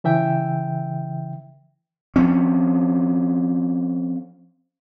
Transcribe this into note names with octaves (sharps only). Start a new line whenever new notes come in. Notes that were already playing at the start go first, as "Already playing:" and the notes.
C#3 E3 E5 G5
F3 C4 C#4